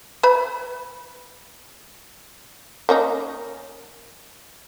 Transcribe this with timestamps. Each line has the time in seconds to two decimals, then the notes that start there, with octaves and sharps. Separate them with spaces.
0.23 B4 E5 B5
2.89 A#3 C#4 D#4